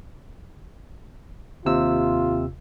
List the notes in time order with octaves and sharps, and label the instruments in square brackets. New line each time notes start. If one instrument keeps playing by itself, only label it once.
[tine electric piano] D#2 C3 E6 [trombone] F4